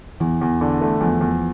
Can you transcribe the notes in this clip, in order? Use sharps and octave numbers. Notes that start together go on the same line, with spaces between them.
E2 E3
E2
D3
A3
E2 F3
E2